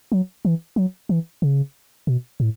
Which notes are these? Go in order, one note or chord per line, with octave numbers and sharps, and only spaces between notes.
F#3
E3
F#3
E3
C#3
B2
A2